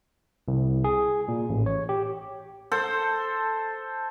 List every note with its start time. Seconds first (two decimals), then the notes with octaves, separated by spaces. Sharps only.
0.48 C2
0.84 G#4
1.28 A#2
1.49 A1
1.66 C#5
1.89 G4
2.72 A4 C5